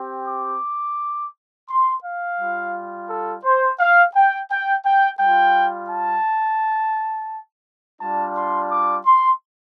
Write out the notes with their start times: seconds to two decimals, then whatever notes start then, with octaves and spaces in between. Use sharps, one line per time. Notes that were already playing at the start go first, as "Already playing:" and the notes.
Already playing: C4 G4
0.29 D6
1.69 C6
2.04 F5
2.39 G3 F4
3.09 A4
3.44 C5
3.79 F5
4.15 G5
4.50 G5
4.84 G5
5.20 G3 F4 G5
5.90 A5
8.01 G3 D4 F4 A5
8.36 C6
8.71 D6
9.06 C6